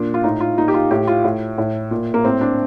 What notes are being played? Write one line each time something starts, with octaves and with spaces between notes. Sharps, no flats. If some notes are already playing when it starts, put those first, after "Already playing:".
Already playing: A#2 D4
F4
A2 D#4
F4
A#2 D#4
G4
F4
A2 G4
F4
A2
A2
A#2
A#3
A2 C4
D4